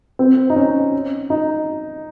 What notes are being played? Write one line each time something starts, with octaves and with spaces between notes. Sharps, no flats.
C4
D#4
C#4
D#4